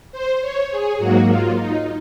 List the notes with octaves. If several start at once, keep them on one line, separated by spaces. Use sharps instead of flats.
C5
C#5
G#4
G#2 F#3 A#3 F#4
F4
D#4